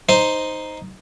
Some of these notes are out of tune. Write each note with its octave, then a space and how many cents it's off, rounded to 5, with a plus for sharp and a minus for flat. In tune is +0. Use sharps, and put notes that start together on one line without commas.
D#4 +0 C5 +0